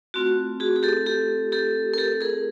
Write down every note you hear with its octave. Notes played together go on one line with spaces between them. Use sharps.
A3 C4 F4 F#4
F#4 G#4
G#4
G4 A4
G4 A4
G4 A4
A#4
G4 A4
G#4 A#4